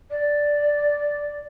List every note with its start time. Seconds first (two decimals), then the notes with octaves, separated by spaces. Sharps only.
0.10 D5